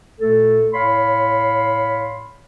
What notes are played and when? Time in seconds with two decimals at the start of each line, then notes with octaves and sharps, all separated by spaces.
0.20 A#2 A3 A4
0.73 A2 C#5 F5 B5 C6